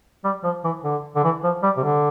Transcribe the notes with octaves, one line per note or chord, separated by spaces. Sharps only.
G3
F3
E3
D3
D3
E3
F3
G3
C3
D3